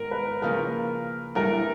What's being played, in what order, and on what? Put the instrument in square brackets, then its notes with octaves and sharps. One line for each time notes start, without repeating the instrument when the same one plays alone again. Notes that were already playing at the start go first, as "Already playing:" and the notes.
Already playing: [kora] G#2 D#3 B3 [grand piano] A#4
[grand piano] B4
[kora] C#3 F3 A#3 C#4 [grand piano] A#4
[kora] G2 E3 A3 [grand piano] A#4